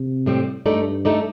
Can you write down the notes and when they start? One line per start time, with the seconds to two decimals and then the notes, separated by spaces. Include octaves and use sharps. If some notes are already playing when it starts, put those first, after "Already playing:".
Already playing: C3
0.26 A2 G3 C4
0.66 G2 A3 D#4 A4 D5
1.05 A3 D#4 A4 D5